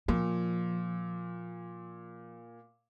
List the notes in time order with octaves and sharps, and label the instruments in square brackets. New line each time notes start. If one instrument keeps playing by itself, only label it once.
[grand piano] A#2 [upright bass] F3